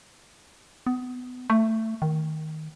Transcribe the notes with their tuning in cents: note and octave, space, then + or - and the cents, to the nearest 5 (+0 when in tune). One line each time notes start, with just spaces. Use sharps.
B3 +25
A3 +15
D#3 +5